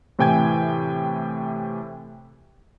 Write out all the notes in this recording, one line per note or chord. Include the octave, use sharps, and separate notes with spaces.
A2 C3 E3 G5 G#5 G#6